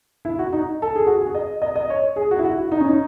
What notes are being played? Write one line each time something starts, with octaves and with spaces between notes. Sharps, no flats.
E4
F#4
D#4
A4
G#4
F#4
G#4
D#5
D#5
D#5
C#5
G#4
F#4
E4
F#4
E4
D#4
C#4
D#4